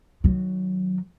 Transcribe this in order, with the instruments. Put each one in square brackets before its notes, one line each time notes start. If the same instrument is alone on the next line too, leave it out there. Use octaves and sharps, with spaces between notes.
[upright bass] D#3 F#3